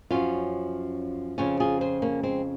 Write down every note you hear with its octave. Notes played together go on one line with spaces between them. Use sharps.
F#2 F3 C#4 F4
F2 C#3 F3 C#4 F4
F4 G#4
G#4 C5
A#3 C#4
G#3 C4